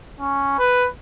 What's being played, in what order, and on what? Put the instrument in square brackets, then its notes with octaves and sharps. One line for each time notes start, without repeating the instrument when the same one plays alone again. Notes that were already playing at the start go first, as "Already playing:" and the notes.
[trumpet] C#4
B4